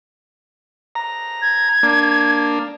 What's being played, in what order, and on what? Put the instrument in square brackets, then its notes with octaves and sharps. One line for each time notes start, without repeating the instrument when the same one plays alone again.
[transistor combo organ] A#5
[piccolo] G#6
[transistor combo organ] A#3 D4